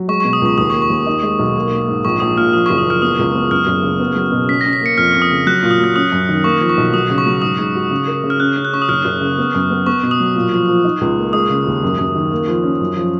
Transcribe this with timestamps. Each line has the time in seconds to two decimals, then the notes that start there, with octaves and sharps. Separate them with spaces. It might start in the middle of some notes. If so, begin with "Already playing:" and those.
Already playing: F#3
0.08 G#3 C#6
0.20 C#6
0.25 B2
0.33 D#6
0.41 C#2 C#6
0.58 D#2 D#6
0.70 C#6
0.74 A#3
0.82 C#6
0.90 D#2
1.06 D#4
1.23 G#3
1.39 B1
1.56 A#3
1.72 A#3
1.88 G#2
2.05 A#1 C#6
2.20 A#1 D#6
2.37 A#2 F6
2.53 F3 D#6
2.66 C#6
2.70 F#1
2.78 D#6
2.85 F3
2.90 F6
3.02 B3 D#6
3.19 C#2
3.35 B3
3.51 F#2 F6
3.67 F#1
3.83 C#3
4.00 B3
4.16 F#3
4.32 B2
4.48 C#4 B6
4.61 A#6
4.66 C#4
4.73 B6
4.81 A#3 C#7
4.98 F2 F6
5.14 F2
5.22 D#6
5.31 C#3
5.46 F#3 F#6
5.63 A#2
5.71 D#6
5.80 F#3 F6
5.96 C#4 D#6
6.12 F#2
6.29 D#3
6.44 A#3 C#6
6.61 F3
6.69 C#6
6.77 B1
6.93 F#3 D#6
7.10 C#3
7.18 C#6
7.26 F#3
7.42 G#2 D#6
7.59 G#2
7.75 F#4
7.91 C#3
8.07 A#4
8.24 C#3
8.30 F6
8.40 C#4 F#6
8.57 C#4
8.65 F#6
8.73 C#4 C#6
8.82 D#6
8.89 F#1 F6
9.05 F#1
9.21 C#3
9.38 B3
9.54 F#2
9.70 B3
9.86 B3 C#6
10.03 B2
10.11 D#6
10.20 F#3
10.36 A#2
10.52 F3
10.68 F3
10.84 D#4
11.01 C#2
11.17 A#3
11.33 G#3 D#6
11.50 C#3
11.67 D#2
11.83 F#2
11.98 F#2
12.15 D#3
12.31 A#3
12.48 F3
12.64 C#4
12.80 F#2
12.96 F3